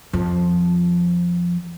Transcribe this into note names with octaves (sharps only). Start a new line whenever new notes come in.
F2 F3